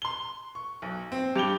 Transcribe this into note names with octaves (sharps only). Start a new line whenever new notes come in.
C6 G7
C#6
B1
C4
G2 G4 F7 G7